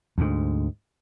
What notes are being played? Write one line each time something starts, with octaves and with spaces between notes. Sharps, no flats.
D2 G#2